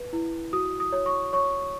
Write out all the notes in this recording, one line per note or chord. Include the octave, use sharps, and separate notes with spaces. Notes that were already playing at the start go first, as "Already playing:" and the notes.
Already playing: B4
E4
F#4 D#6
D#6
C#5
C#6
C#5 C#6